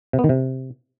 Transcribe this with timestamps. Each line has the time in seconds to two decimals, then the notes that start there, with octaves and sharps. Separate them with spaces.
0.13 C3
0.19 B3
0.24 D#3
0.29 C3